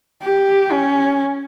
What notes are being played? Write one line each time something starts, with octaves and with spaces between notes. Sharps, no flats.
G4
C#4